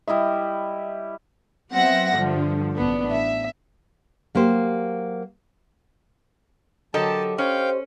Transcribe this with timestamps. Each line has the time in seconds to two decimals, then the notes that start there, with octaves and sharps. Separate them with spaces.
0.08 G3 E4 D#5 E5
1.72 F#3 B3 C4 E5 F#5 A#6
2.15 G2 D3 F3
2.74 A1 B3 D4
3.11 E5
4.35 F#3 A#3 G4 C5
6.94 D3 F#3 G4 A4 A#4 D#5 A5
7.38 C#4 C5 F5 G5